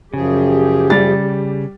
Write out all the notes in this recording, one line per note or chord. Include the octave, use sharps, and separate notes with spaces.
F#2 C#3 F3 G4 G#4
G3 A6